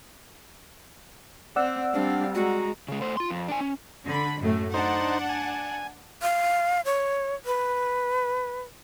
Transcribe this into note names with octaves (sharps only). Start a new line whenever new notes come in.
C4 D5 F#5 E6
G3 C4 D4 F5
G#3 F#4 A#5
C#3 G#3
A3 C5
F4 C6
F2
D4 G#5
C#4
D3 B5
F#2 A2 A3
D4 D#4 C5 F#5
G#5
F5
C#5
B4